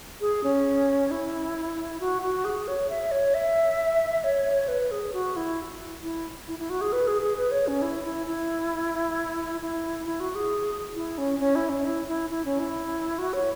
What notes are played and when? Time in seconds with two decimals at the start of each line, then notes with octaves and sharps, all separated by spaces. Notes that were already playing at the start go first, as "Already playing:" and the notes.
0.21 G#4
0.44 C#4
1.11 E4
2.00 F#4
2.22 F#4
2.45 G#4
2.68 C#5
2.90 E5
3.11 C#5
3.34 E5
4.24 C#5
4.68 B4
4.91 G#4
5.13 F#4
5.36 E4
6.03 E4
6.48 E4
6.59 E4
6.70 F#4
6.81 G#4
6.93 B4
7.07 G#4
7.22 G#4
7.37 B4
7.51 C#5
7.67 C#4
7.82 E4
8.04 E4
8.27 E4
9.61 E4
10.06 E4
10.20 F#4
10.35 G#4
10.95 E4
11.18 C#4
11.40 C#4
11.55 E4
11.69 C#4
11.85 E4
12.08 E4
12.30 E4
12.45 C#4
12.59 E4
13.19 F#4
13.33 C#5